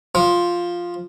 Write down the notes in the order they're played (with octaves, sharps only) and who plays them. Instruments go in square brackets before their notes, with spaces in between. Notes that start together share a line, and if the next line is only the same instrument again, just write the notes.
[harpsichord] F3